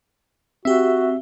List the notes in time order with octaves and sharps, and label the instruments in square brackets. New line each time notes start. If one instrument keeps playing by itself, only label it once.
[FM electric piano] C4 G4 [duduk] F#4 [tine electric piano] E5